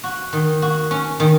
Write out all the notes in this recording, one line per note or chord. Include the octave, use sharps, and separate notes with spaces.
F#4
D#3
F#4
C#4
D#3